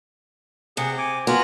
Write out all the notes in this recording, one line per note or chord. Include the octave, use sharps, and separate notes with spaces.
C3 G#4 F#5
G#5 D6
B3 F4 F#4 G#5 A#5